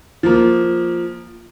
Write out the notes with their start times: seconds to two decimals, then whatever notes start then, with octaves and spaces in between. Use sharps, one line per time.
0.23 F3 A#3